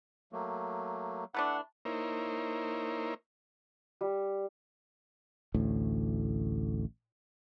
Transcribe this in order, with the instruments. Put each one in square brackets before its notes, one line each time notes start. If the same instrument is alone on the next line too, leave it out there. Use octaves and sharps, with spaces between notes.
[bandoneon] F#3 A3 A#3
[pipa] E3 A3 D4 [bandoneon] F#5
[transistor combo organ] A#3 D#4 E4 A#4 C5 C#5
[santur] G3
[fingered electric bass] A1 D2 A2